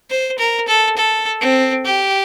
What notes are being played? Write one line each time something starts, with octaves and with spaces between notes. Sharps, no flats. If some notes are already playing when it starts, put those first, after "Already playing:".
C5
A#4
A4
A4
C4
G4